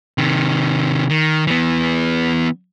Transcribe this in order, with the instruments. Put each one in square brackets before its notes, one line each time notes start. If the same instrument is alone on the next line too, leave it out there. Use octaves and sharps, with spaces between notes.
[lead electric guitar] C3 D#3
D#3
E3 B3